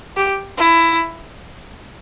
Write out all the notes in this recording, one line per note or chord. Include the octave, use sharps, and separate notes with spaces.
G4
E4